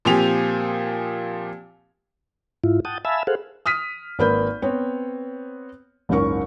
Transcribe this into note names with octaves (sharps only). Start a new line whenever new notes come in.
A#2 F3 C4 G4 G#5 F7
G#2 E4 F4
F#5 G5 A5 D#6
E5 F5 G#5 A5 B5 E6
G#4 A4 C5 F5 F#5
D#6 F6 B6 D#7
G#1 A#3 B4 B5 G6
B3 C4 C#5
F#1 C#2 G#2 C#4 A#4 C#6